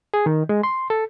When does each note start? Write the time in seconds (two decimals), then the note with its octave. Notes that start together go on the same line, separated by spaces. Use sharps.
0.14 G#4
0.26 D#3
0.49 G#3
0.63 C6
0.90 A4